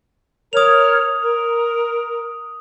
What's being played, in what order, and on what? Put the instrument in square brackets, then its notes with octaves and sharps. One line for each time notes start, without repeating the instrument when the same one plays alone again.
[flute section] A#4 C#5 F6 [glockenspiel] D#6 F7
[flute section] A#4